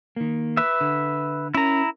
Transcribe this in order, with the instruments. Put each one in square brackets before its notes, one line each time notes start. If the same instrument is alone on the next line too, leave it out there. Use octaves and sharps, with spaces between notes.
[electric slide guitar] D#3 A#3
[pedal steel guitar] B4 E5
[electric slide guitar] D3
[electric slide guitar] C#4 A#4 [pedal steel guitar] E4 A#5